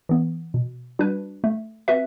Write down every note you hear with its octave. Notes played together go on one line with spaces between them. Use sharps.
E3 B3
B2
G3 D4 F#4 B4
A3
C4 F#4 B4 E5